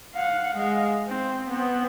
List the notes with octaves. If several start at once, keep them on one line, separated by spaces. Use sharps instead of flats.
F5 F#5
G#3 F5
C4
B3 C4